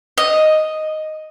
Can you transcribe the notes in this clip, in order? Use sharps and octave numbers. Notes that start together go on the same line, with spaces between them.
D#5